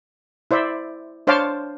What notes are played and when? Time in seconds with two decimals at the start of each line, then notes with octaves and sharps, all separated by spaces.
0.51 E4 C5 D5 E5
1.27 D4 C5 C#5 F5 A5 D6